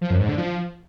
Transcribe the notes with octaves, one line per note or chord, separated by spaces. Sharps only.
F3
F#2
G#2
D3
F3